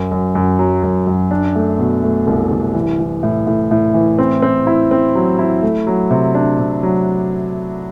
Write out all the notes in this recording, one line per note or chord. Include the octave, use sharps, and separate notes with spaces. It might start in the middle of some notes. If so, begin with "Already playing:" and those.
Already playing: F#2
F#2
F#2
F#3
F#2
F#2
D4
A3
B2
A3
C2
C2
E3
E3
A2
A2
A2
E3
C4
C4
E4
C4
F#3
E4
A3
F#3
C3
D4
C3
F#3